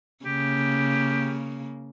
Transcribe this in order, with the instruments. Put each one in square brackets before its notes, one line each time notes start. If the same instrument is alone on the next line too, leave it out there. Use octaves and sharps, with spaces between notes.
[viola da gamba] C#3 A#3 [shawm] G4